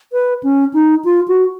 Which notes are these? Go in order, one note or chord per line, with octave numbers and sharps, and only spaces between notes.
B4
C#4
D#4
F4
F#4